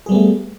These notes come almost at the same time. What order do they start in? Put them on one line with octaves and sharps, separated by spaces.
G#4 G3 B3 A3